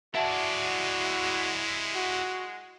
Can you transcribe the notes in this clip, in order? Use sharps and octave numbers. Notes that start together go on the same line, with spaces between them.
G#3 E4 F#4 D5 E5 F#5 A5
F#4